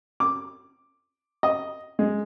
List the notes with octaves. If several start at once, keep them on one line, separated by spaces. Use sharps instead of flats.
D6
D#5
G#3